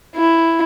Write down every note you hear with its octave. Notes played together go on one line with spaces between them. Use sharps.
E4